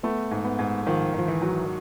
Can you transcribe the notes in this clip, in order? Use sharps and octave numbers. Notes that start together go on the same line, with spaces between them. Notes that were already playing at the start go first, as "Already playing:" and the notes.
A3 B3
G#2
B3
G#2
D#3 F3
D#3 F3
E3
F#3